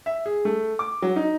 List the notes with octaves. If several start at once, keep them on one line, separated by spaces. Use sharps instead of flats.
E5
G#4
A3
D6
F#3
D#4